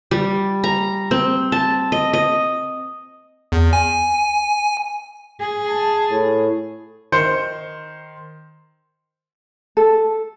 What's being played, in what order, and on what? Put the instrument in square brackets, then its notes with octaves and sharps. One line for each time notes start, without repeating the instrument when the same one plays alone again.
[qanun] G3
A#5
C4
A5
D#5
D#5
[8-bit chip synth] E2
G#5
[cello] G#4
[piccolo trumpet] A5
[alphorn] A2
[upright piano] D#3 C5 C6 G6 C#7
[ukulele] A4